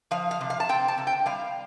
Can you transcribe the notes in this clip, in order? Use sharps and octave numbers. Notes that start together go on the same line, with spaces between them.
F3 F5
F5
C3
F5
A5
C4 G5
A5
C3
G5
G3 F5